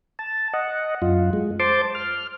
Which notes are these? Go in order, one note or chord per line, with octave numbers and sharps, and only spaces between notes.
A5
D#5 F#5
F#2 F4
G#3
C5 A5 C6 D6
F6